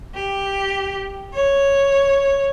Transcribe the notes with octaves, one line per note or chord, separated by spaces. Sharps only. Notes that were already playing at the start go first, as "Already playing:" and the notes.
G4
C#5